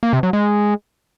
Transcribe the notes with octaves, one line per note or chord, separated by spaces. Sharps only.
A#3
C3
F#3
G#3